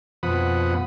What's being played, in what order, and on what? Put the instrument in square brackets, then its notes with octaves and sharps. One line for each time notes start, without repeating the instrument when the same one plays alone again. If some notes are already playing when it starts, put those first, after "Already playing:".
[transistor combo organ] F2 B2 F3 F#5 B5 D#6